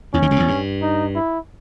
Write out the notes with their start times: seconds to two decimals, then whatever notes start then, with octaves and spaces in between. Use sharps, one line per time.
0.14 E2 E3 C#4
0.22 D#2 D#3
0.31 C#2 C#3
0.40 E2
0.48 G2
0.82 D#4
1.15 E4